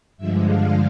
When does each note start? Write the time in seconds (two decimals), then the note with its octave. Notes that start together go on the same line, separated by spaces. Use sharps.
0.18 G2 D3 F3 G#3 E5
0.46 F5